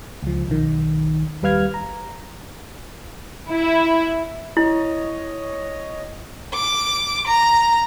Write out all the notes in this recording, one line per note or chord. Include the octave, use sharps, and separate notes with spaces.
C#2 F3
B1 D#3
D#2 G3 B4 F5 F6 G#6
A#5
E4
E4 C#5 D#5
D6
A#5